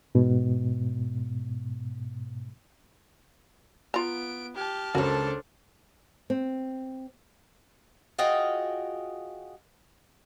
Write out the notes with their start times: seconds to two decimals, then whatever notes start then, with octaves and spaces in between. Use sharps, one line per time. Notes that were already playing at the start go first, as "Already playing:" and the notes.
0.15 G#2 B2
3.94 B3 F4 A#5 D7
4.57 G4 A5 F6
4.95 C#2 D4 F#4 A4 A#4 C5 C#5
6.30 C4
8.18 F4 F#4 G#4 D#5 F5 G5